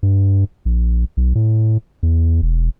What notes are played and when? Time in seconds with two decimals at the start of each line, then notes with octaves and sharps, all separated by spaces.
0.03 G2
0.65 A#1
1.17 B1
1.35 A2
2.03 E2
2.42 E1